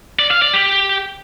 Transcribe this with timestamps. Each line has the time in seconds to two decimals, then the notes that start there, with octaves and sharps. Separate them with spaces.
0.19 D5
0.31 F5
0.42 D5
0.53 G4